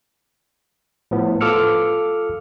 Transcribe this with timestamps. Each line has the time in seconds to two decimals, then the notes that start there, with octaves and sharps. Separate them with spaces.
1.11 A2 F3 B3
1.41 F4 A4 D6 E6 F6 C#7